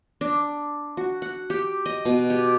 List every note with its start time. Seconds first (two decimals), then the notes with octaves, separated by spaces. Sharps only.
0.21 D4
0.97 F#4
1.22 F#5
1.50 G4
1.86 D#5
2.05 B2
2.30 G4